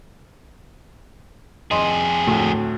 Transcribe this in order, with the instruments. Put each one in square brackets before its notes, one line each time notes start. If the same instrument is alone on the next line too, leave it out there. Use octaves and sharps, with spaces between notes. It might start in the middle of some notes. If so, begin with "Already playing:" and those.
[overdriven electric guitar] F2 G#4 [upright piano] D#5 C6
[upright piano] D2 A2